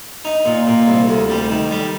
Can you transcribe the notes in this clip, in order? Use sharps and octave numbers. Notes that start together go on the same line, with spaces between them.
D#4
A#2
A#2
C2
D2
G3
D#3
G3